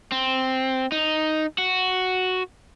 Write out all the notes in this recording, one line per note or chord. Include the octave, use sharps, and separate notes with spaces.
C4
D#4
F#4